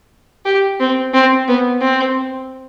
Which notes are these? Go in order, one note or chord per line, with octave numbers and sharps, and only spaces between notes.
G4
C4
C4
B3
C4